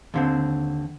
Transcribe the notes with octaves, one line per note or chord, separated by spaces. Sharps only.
D#2 D3 C4